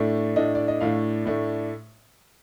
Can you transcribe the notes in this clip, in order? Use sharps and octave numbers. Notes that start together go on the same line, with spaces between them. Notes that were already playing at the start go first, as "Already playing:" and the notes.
Already playing: A2 A3 D4
A2 A3 D4 D#5
D5
D#5
A2 A3 D4 F5
A2 A3 D4